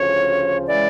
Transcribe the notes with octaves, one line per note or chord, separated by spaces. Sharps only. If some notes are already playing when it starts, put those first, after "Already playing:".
Already playing: D2 C#3 F3 C#5
C#3 E3 G#3 D5